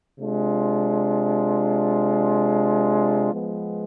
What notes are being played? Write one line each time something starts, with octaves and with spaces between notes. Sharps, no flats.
C3 G#3 D4 F4
F3 G#3 B3